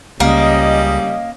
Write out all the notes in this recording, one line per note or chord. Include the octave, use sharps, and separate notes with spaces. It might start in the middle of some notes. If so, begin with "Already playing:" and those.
C#2 G3 A#3 C#4 D#5